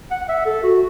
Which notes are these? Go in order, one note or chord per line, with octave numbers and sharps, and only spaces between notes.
F#5
E5
A4
F#4